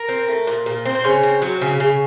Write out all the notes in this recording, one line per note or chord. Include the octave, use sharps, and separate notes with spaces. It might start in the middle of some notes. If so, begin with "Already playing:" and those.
Already playing: A#4
C4
A3
A#2
A#2
C4
C5
C#3 C#5
C4
F#3
C#3
C#3